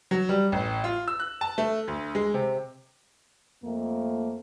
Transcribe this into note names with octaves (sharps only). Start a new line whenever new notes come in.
F#3
G3
A1
F4
E6
F#6
A5
A3
D2
G#3
C3
F2 A3 A#3